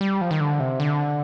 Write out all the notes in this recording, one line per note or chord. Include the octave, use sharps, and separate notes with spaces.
G3
F3
D#3
D3
C3
D3